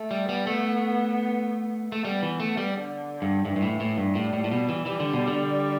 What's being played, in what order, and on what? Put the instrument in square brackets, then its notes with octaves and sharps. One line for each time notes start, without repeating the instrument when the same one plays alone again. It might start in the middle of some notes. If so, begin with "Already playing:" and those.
Already playing: [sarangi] A3
[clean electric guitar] G3
[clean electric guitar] G3 [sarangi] B3
[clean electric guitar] A3
A3
[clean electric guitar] G3 [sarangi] B3
[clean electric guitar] E3
A3
G3
[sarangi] D3
[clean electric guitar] G2
[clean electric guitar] G2 [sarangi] E3
[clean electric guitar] G2
A2
A2
G2
[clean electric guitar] A2 [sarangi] G3
[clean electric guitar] A2
A2
B2
E3
[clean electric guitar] E3 [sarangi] G3
[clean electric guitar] D3
B2
D3